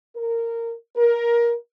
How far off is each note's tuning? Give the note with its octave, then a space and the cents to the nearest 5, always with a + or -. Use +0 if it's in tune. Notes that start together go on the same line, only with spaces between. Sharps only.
A#4 -15
A#4 +20